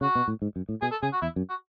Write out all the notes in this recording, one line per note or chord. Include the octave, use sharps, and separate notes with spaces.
C#3 F#4
B2
A2
G#2
F#2
A2
B2 G#4
A4
C#3 G#4
F#4
E2 E4
F#2
F#4